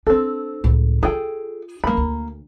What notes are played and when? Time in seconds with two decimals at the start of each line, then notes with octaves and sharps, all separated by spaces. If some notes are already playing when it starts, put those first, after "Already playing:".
0.07 C4 D4 A4
0.64 C#2 A2
1.03 F4 G#4 A4 G5
1.84 G#3 A#3 C#4 B5
1.97 D2